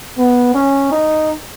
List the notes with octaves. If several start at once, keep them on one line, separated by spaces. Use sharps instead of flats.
B3
C#4
D#4